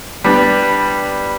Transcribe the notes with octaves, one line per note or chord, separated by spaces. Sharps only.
G3 B3 D4